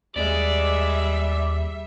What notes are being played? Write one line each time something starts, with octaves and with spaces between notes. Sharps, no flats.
D#2 G3 G#3 D5 E5